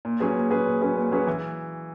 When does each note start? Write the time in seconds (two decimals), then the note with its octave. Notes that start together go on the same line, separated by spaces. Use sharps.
0.05 A#2
0.20 F#3 C#4 G#4 B4
0.36 A#2
0.51 F#3 C#4 G#4 B4
0.66 A#2
0.82 F#3 C#4 G#4 B4
0.96 A#2
1.12 F#3 C#4 G#4 B4
1.27 E3